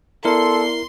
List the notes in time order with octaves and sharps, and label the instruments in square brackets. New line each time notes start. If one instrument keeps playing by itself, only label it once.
[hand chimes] B3 D5 C#7 [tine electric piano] E4 A#4 [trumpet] A4 [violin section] C6